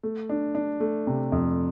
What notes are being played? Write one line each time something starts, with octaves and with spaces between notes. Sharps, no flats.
A3
D4
D4
A3
C3
F2